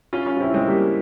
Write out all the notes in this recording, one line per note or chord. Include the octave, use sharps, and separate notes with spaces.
C#4 F4
C#4 F4
F4
C4 E4
G#3 C4
G3 A#3